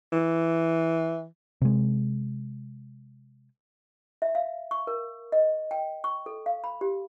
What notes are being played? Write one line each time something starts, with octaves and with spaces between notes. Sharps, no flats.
E3
C3 G#3
E5
F5
C#6
A#4
D#5
G5
C#6
A4
F5
B5
G4